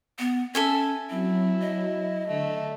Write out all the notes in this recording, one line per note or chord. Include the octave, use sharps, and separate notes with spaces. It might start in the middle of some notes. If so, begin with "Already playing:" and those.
B3
C#4 A4 E5 G#5
F#3 C4 E4
D#5
D3 A3